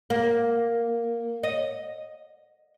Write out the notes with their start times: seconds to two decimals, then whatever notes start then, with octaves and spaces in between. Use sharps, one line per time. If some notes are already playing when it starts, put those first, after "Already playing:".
0.10 A#3
1.43 D#5